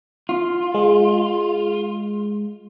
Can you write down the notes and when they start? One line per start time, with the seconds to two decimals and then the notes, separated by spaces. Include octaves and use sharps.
0.29 F4
0.74 G#3